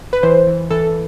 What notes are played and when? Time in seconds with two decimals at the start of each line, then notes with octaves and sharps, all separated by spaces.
0.13 B4
0.23 E3 C5
0.47 E3
0.71 E3 A4